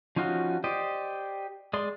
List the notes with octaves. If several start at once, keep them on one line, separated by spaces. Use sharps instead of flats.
F3 C#4 D#4 F4 F#4
G4 C5 D5 D#5
G#3 G#4 D5 C6